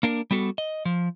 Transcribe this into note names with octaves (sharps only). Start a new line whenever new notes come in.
A#3 D4 A#4
G3 B3 F#4 A4
D#5
F3